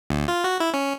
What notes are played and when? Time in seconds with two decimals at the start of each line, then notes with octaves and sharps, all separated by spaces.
0.10 D2
0.28 F4
0.44 F#4
0.60 E4
0.74 C#4